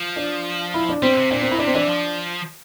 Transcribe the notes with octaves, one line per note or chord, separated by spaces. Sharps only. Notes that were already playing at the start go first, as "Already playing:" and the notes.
Already playing: F3
D4
E4
D4
G3 C4
D3
C3
A#2 D4
C4
E4
C3 D4
C4
E3 D4
F3